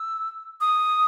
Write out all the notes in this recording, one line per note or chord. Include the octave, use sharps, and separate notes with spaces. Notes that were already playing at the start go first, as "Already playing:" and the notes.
Already playing: E6
D#6